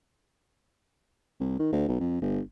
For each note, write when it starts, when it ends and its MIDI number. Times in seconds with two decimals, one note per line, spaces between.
1.40 1.59 36
1.59 1.70 51
1.72 1.85 38
1.88 1.97 35
2.00 2.21 41
2.21 2.39 31